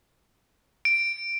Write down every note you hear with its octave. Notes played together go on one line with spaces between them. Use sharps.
D7